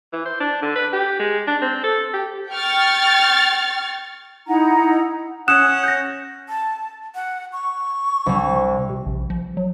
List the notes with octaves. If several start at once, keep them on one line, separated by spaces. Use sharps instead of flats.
E3
C5
D4
D3
B4
G4
G#3
D4
C4
A4
G4
G5 C#6 F6 A6
D#4 E4 F#5 A#5
C#4 F#5 D#6 F#6 E7
G6 A#6
A5
F#5
C#6
C2 G3
C3
A#1
F3
F#3